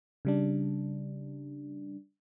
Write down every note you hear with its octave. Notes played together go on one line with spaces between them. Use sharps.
C#3 G3 D4